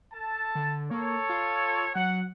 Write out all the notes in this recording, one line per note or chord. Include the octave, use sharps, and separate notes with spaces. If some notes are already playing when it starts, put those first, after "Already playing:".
A4 A5
D3
A#3 A4 C#5
F4
F#3 F#5